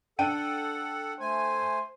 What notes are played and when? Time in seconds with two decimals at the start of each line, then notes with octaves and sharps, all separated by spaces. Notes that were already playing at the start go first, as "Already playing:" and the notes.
0.19 D4 A4 F#5 G5 D#7
1.20 A3 C5 G#5